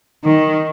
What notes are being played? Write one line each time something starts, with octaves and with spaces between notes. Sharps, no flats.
D#3